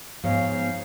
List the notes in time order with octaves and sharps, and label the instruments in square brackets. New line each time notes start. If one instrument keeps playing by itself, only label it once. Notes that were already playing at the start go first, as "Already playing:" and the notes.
[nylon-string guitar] G#2 [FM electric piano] F3 [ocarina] B3 [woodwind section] C#5 F5